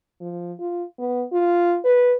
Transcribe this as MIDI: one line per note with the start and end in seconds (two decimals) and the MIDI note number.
0.21 0.53 53
0.60 0.85 65
0.99 1.24 59
1.33 1.79 65
1.84 2.16 71